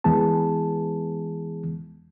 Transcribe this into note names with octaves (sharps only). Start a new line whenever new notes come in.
E2 E3 G#3 B3 G#4 A5